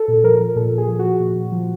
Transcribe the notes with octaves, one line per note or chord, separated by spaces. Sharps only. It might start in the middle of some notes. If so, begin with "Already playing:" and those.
Already playing: A4
A#2
F3 A#4
F3
A#2 A4
A#2
G#4
F3
F3 F#4
A#2
A#2
F3